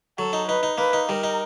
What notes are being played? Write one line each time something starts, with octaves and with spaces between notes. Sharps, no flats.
F#3 A4
D#4
D#4 B4
D#4
A#3 B4
D#4
G3 A#4
D#4